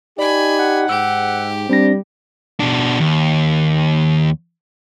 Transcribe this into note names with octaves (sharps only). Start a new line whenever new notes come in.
D#4 G4 D5 G#5 B5
F#5
G#2 G4 E6
G3 C4 D4 A#6
B2 D4
D#2